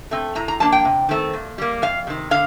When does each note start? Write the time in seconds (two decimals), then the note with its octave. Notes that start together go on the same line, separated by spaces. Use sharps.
0.11 A3 C4
0.35 A2 A#5
0.48 A#5
0.60 F3 A#3 D4 A5
0.72 G5
0.85 C3
1.09 D#3 A3 C4
1.33 A#2
1.58 G3 A#3
1.82 F2 F5
2.07 C3 D#3
2.31 D3 F5